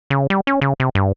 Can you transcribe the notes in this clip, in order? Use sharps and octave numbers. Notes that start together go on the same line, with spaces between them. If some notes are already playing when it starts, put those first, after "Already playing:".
C#3
G3
C#4
C#3
C3
G2